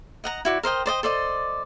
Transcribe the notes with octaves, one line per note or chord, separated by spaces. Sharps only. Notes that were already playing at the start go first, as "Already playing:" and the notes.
D#5 F#5 A#5
E4 F#4 D5
A#4 C5 D#5 G5
C5 D5 D#5 G5
A4 C5 D5 D#5